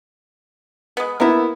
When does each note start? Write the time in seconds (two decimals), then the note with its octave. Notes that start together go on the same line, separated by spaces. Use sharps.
0.97 G#3 B3
1.20 A#3 B3 E4 A#4 E5